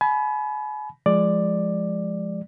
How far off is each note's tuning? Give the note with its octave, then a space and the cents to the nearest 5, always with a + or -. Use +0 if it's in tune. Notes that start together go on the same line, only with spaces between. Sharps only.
G#5 +40 B5 +0
F3 +0 G#3 +0 D5 +10